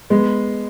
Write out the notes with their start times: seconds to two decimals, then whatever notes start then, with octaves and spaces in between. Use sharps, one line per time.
0.10 G#3 B3